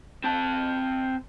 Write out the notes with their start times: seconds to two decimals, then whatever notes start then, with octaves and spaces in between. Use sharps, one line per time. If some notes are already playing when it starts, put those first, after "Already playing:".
0.24 C4 A5